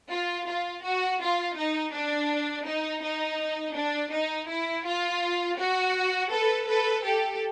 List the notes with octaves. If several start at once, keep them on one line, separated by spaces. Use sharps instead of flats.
F4
F4
F#4
F4
D#4
D4
D#4
D#4
D4
D#4
E4
F4
F#4
A4 B4
A4 B4
G4 A4